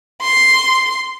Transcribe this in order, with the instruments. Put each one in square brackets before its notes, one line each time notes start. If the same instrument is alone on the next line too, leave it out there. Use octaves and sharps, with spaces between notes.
[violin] C6